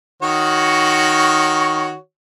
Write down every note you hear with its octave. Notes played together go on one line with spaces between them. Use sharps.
D#3 F#4 C#5